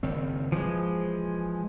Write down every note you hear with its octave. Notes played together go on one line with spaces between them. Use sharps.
F#1 D#3 C4
E3 F3 G#3